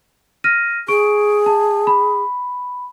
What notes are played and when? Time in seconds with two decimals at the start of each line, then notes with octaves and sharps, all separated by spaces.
0.44 F6 A#6 D#7
0.88 G#4 C#6 D7
1.46 A5
1.87 B5